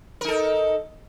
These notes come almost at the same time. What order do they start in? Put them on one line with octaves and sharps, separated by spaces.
A#4 D#4 A4